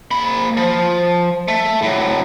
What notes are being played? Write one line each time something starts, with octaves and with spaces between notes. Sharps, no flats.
A#3 B5
F3
A3
A2 F#3